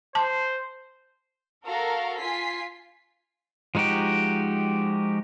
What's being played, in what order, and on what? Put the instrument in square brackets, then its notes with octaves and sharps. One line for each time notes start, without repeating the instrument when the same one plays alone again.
[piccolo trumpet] C5 [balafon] A5
[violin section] F#4 A4 A#4 F5 A#5
F4 G#5 B6 C7
[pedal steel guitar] F3 G#3 D#4 F#4 G4